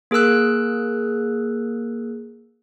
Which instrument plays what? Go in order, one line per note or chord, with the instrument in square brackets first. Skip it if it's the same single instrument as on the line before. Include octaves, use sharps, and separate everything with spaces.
[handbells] A#3 G#4 A#4 E6 F#6